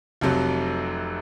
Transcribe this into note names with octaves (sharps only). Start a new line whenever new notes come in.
F1 F2 C3 F#3